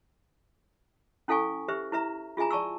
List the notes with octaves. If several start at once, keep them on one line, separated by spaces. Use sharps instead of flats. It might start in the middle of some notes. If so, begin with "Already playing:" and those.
C#4 E4 A4 F5 G#5 C#6
G4 B4 C5 E5
E4 B4 E5 A#5
F4 G#4 E5 G#5 A#5
D5 A5 C#6 E6